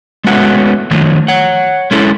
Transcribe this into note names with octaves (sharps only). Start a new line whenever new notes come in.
G#3 A3 B3 C#4 F#4 F#5
D#3 F3 F#3 A3
C#5 F#5
G#3 C#4 E4 A4